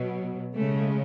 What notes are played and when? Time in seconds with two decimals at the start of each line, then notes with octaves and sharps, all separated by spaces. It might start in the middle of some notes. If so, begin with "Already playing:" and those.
Already playing: B2 F#3
0.55 C#3 G#3 A3